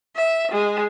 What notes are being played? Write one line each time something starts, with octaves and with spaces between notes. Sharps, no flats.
E5
G#3